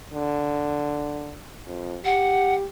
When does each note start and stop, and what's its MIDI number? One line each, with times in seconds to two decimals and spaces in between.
0.14 1.37 50
1.67 1.98 41
2.05 2.66 67
2.05 2.54 78